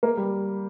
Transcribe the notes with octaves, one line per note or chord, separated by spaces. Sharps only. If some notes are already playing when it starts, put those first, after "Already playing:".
A#3
G3